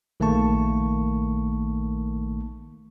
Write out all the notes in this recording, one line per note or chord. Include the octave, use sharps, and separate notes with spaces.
A#1 D#3 A3 A#3 A5 C#6